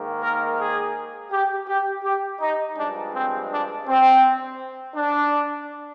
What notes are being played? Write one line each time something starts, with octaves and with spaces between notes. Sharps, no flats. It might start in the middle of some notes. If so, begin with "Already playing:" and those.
Already playing: G#2 D#3 A#3
A#4
G#4
G4
G4
G4
D#4
G2 F3 G#3 D4
C4
D4
C4
D4